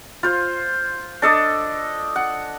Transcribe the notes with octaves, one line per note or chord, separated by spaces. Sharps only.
F4 C5
D4 A4 D#5
F#5